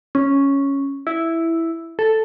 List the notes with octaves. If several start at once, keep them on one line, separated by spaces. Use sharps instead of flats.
C#4
E4
A4